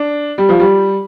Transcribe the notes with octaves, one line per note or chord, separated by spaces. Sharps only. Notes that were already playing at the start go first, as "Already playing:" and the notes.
Already playing: D4
G3
F3
G3